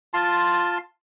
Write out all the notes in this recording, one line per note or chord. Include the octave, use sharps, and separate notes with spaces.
F4 A5 C6